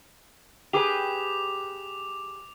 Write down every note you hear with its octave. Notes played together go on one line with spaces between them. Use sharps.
G4 G#4 B4 D6 F7